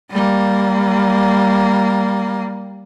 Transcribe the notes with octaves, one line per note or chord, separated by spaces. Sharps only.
G3 A#3